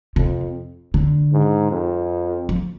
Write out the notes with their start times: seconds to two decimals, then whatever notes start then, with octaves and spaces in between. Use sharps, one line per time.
0.16 F2 C3
0.94 D3
1.33 G#2
1.72 F2
2.49 F3